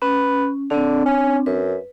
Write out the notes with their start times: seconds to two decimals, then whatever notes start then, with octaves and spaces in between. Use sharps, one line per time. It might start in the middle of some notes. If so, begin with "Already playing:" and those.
0.02 C#4 B4
0.70 D3 C4 D4
1.05 C#4
1.46 F#2 B4